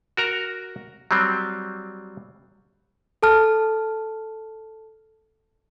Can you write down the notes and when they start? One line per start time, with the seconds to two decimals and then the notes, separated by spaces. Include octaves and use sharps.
0.17 F#4 A#4 A#5
1.11 F#3 G3 C4
3.23 A4 A5 F6